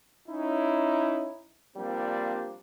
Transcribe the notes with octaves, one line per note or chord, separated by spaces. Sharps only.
C#4 D#4 E4
F3 G3 A#3 C4 D4 G4